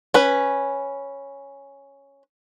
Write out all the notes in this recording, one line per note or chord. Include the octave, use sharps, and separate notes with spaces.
C#4 B4